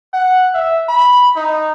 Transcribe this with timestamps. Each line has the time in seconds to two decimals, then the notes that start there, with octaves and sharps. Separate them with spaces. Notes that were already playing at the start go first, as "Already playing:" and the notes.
0.13 F#5
0.54 E5
0.89 B5
1.36 D#4